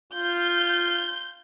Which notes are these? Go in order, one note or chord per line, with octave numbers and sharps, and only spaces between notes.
F4 G6